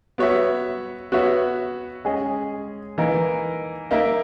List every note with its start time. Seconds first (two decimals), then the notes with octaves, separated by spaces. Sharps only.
0.18 B3 F#4 C#5 E5
1.12 B3 F#4 C#5 E5
2.05 G#3 C#4 G#4 D#5
2.98 E3 A#3 D#4 A#4
3.91 A#3 D#4 A#4 E5